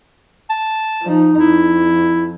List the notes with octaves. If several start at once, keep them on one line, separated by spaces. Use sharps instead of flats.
A5
F3 D#4
F2 E4